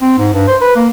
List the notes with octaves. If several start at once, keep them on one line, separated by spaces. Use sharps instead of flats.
C4
G#2
G2
C5
B4
A#3